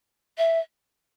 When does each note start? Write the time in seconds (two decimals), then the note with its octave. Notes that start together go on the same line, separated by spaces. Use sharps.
0.37 E5